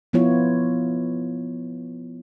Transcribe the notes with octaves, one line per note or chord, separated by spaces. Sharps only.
F3 B3 E4 F4 C#5